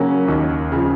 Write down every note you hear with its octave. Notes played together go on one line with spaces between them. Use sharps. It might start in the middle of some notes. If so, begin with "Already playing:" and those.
Already playing: C#3 F#3 A#3 C#4
D#2
C#3 F3